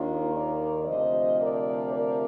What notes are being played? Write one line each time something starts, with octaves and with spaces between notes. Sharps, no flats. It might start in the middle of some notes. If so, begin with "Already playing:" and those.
Already playing: D#2 D#3 A#3 D4 F4
A#4 D5
D2 C3 F3 C5 D#5
A#4 D5
A#4 D5